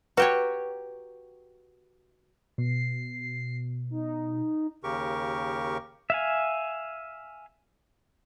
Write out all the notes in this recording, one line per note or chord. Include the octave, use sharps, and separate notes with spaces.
F#4 G4 B4 C#5 A#5
B2 C7
D#4
D#2 C#3 G4 A#4 C#6
E5 F5 G#5